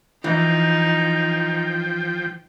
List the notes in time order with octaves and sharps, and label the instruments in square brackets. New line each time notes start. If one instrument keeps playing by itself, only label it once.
[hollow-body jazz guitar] E3 [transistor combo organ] F3 G5 [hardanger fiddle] D#4